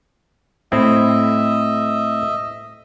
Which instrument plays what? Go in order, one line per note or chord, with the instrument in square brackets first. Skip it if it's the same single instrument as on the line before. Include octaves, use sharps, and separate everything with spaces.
[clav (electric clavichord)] A2 C4 E4 [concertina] D#5 E5